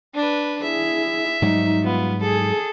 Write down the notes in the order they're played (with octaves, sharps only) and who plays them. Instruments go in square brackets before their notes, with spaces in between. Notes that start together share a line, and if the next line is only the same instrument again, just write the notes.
[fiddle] D4 B4
[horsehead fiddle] E4 G#4 [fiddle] E5
[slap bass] G#2 F#3 G3 [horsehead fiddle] D#4
[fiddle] B3 [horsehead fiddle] F4
[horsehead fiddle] G#4 [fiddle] A4